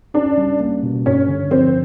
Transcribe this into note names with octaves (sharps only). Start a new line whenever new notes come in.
C#4 D4
G3
A#3
B2
G2 C#4
D3
F3 C4